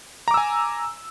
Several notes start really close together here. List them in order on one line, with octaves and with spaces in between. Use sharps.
A#5 D6 E6 G#5